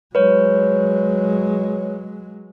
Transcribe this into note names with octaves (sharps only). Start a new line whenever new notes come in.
F#3 G#3 B4 C#5